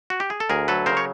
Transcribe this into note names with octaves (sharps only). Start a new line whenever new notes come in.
F#4
G4
G#4
A4
D2 G#4 A#4
F#3 A4 B4
C#3 A#4 C5
C#5